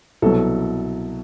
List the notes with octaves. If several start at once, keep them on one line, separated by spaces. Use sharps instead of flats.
C2 B2 F#3 A4